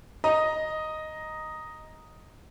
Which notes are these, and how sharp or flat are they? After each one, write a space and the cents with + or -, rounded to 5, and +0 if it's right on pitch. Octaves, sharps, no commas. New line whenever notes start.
D#5 +0 A#5 +0